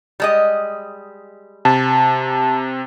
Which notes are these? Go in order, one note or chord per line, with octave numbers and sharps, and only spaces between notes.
G3 G#3 D#5
C3 A5